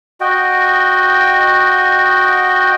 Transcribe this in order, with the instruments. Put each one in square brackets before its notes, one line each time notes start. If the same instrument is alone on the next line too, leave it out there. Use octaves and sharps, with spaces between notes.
[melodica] F#4 D#5 G5